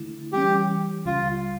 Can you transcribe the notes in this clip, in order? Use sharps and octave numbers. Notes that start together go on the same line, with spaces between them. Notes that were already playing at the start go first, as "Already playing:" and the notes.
Already playing: D3 A3 E4
E3 G3 C#4 G4
C#2 C#3 G3 F4